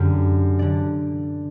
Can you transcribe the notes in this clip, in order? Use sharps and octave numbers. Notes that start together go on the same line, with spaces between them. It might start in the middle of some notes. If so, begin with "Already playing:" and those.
Already playing: F#2 D3 G4
D3 D5